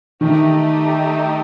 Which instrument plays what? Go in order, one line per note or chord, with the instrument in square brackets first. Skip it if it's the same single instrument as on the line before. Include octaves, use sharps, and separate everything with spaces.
[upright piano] D#3 [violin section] A3 D#4 G4